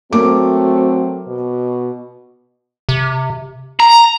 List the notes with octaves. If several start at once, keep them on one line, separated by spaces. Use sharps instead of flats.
F#3 A3 A#3 C4 D6
B2
C3
A#5